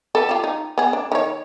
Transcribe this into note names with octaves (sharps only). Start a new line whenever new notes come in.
A4 B4
F4 G4
D#4
B3 G#4
D4
D#3 E4 C#5